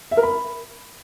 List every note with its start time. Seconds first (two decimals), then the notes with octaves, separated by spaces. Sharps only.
0.11 E5
0.17 A#4
0.23 B5